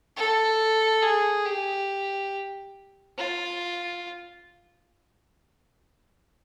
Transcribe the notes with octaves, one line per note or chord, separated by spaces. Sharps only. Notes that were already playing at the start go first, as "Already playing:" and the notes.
A4
G#4
G4
F4